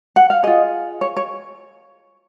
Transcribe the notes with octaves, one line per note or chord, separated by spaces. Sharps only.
F#5
F5
F4 G#4 D#5
C#5
C#5